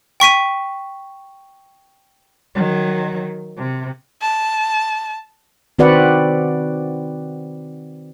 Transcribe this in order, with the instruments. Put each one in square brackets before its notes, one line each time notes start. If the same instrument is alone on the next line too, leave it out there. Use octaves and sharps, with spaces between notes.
[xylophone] G5 C#6 B6 D#7
[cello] D#3 F#3
C3
[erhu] A5
[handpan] D#3 C4 F#4 B4 D5 F#5